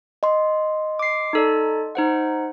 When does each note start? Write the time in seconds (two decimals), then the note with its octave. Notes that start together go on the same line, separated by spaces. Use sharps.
0.23 D#5 C6
0.99 D6 C7
1.33 D#4 A4 D5
1.95 D#4 C5 F#5